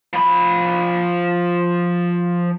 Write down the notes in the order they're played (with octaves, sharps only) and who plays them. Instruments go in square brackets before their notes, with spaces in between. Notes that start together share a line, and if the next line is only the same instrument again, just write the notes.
[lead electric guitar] F3 B5